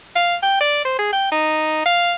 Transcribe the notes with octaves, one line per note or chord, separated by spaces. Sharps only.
F5
G5
D5
C5
G#4
G5
D#4
F5